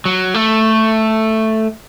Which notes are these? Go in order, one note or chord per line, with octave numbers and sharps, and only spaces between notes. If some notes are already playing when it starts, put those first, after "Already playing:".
F#3
A3